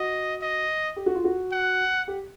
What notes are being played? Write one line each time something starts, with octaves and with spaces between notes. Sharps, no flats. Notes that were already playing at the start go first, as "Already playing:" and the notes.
Already playing: F#4 D#5
D#5
G4
F#4
F4
F#4
F#5
G4